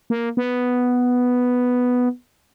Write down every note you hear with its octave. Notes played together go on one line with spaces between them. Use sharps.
A#3
B3